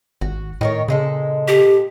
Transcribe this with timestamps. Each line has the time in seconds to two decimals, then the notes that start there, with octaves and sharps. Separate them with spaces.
0.21 G#1 F#4
0.61 A2 D#3 A#4 C#5
0.88 A#2 C#3 G#3 A4
1.48 G4